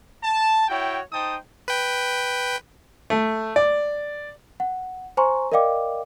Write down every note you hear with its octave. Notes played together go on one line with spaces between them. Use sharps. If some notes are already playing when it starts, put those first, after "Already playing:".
A5
E4 F#4 C#5 G5
D#4 C5 G5 A5 D#6
B4 G5
A3
D5
F#5
C5 G#5 A#5 C6 C#6
A#4 D5 D#5 F5 G5 D6